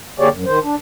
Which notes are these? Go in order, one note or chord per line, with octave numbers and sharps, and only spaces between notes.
D3 A#3 G4 G#4 C#5 D5
F#2
D#3 C5
D4